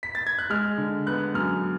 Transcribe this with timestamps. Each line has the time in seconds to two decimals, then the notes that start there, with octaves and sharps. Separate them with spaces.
0.03 B6
0.15 A6
0.27 G#6
0.39 F#6
0.50 G#3 F6
0.78 D3
1.07 B3 F#6
1.34 F#2 F6